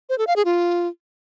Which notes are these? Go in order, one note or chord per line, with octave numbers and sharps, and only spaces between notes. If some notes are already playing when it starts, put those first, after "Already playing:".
C5
A4
F5
G#4
F4